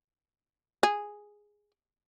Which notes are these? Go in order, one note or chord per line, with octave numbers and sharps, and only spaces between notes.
G#4